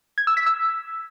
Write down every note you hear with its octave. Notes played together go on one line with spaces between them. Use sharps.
G#6
E6
B6
E6